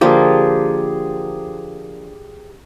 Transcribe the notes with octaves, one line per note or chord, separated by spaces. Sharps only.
D3 F3 A#3 G4 G#4